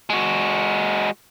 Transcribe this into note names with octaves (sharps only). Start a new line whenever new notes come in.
G#3 F#4